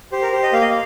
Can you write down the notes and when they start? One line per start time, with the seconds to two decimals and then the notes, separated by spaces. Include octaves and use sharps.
0.12 G4 C5
0.22 A#4
0.32 G4 C5
0.43 D#5
0.53 A#3 F5
0.61 D#5
0.70 F5